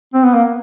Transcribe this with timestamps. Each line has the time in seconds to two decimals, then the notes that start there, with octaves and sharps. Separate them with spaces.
0.14 C4
0.24 B3
0.34 A#3